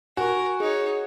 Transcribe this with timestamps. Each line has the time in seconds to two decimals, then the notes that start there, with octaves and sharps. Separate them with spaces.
0.17 F#4 A#4 G#5 C#6
0.60 D#4 G#4 C#5